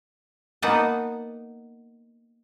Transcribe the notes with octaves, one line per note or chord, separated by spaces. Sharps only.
A#3 B3 D#4 B4 F#5 A5